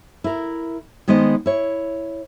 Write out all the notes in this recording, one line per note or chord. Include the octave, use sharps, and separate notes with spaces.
E4 A#4
D#3 G#3 B3 C5 D#5
E4 C#5